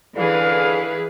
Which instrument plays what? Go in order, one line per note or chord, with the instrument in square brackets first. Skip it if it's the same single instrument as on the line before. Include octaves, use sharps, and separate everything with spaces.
[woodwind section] C#2 D3 F5 [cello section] E3 G#4 B4